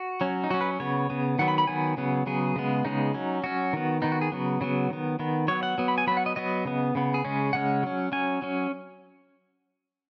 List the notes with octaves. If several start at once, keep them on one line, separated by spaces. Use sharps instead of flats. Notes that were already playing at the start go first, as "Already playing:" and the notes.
Already playing: F#4
F#3 C#4
D#4
F#3 C#4 F#4
B4
C#3 B3 C#5
C#3 B3
D#3 F#3 B3 F#5
B5
B5
D#3 F#3 B3 G#5
C#3 F#3 B3
C#3 F#3 B3 G#4
C#3 G#3 B3
C#3 G#3 B3 D#4
F#3 C#4
F#3 C#4 F#4
D#3 B3
D#3 B3 D#4
F#4
G#4
C#3 F#3 B3
C#3 F#3 B3
D#3 B3
D#3 B3
F#3 B3 C#5
F#5
F#3 B3
B5
G#5
F#3 B3 B5
F#5
D#5
F#3 B3 D#5
C#3 B3
C#3 B3
G#4
C#3 G#3 C#4
C#3 G#3 C#4 F#5
F#3 C#4
F#3 C#4 G#5
F#3 C#4